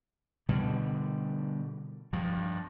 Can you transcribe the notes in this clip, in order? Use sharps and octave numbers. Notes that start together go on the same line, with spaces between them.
B2 D3 G3
G2 F3